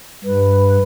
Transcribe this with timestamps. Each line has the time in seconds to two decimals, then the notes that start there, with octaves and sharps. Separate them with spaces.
0.24 G2 B4